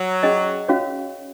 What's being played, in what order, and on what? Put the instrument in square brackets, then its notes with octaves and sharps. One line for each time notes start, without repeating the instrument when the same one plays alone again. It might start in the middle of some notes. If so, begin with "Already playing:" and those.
Already playing: [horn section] F#3
[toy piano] C#4 G#4 D#5 G#5
C#4 F#4 C#5 F5